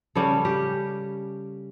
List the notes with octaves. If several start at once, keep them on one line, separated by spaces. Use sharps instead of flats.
C#3 G3 C#4 A4
G4